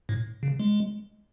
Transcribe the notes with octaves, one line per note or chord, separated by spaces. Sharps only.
A2
C#3
G#3